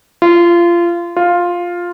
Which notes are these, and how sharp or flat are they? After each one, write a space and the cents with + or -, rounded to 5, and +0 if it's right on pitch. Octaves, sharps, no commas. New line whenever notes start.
F4 -25
F4 +5